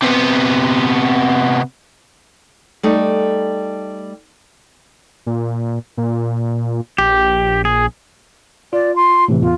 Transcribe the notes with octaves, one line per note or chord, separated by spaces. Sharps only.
C3 B3
G3 A3 D#4
A#2
A#2
A#1 G4
G#4
F4 D5
C6
A2 C3 E3
E2 F4